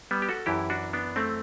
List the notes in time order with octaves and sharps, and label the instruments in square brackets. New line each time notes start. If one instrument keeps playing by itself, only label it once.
[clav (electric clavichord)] G3 B3
G4
F#4 A4
F#2 E3 E4 G4
D4 F#4
B3 D4
A3 C4